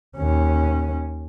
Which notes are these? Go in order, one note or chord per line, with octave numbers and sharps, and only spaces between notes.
D#2 C#4